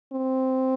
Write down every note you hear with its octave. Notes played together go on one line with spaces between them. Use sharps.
C4